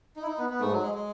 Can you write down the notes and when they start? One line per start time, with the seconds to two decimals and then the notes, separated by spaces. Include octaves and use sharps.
0.16 D#4
0.22 E4
0.27 D#4
0.38 B3
0.50 B3
0.60 G#2 A3
0.72 F#3
0.83 G#3
0.94 G#3